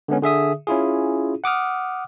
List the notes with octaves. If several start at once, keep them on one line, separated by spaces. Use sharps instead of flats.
D3 G#3 B3 C#4
D3 G#4 E5 D#6
C#4 E4 F4 G#4
F#5 D6 D#6 F6